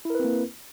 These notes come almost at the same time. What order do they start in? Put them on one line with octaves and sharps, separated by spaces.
E4 A#4 B4 C4 A#3